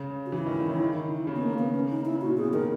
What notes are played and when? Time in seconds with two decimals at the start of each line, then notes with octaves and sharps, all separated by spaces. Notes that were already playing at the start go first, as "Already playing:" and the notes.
Already playing: C#3
0.26 F#4
0.32 E3 E4
0.46 D#3
0.60 C#3
0.74 D#3
1.27 C#3
1.36 B3
1.43 A#3
1.59 B3
1.75 C#4
1.90 D#4
2.05 E4
2.21 A#2 F#4
2.37 B2 G#4
2.53 D#3 A#4